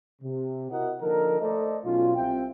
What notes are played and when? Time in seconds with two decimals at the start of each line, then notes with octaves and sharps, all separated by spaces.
0.22 C3
0.70 E4 F#4 A#4 D#5 F#5
1.01 D3 F3 A#3 D#4 A4 A#4
1.40 A3 A4 C5 D5 D#5
1.84 B1 C#4 F4
2.15 C2 C4 F4 E5 G5